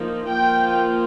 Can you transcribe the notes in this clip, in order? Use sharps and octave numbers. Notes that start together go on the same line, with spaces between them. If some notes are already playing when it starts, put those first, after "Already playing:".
Already playing: F3 A#3 D#4
F3 A#3 F4 G5